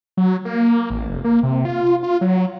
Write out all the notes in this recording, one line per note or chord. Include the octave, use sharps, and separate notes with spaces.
F#3
A#3
A1
F1
A#3
C3
F4
F4
F#3